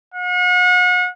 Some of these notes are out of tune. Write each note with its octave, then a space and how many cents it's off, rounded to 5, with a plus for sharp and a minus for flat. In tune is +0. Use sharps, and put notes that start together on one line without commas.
F#5 -40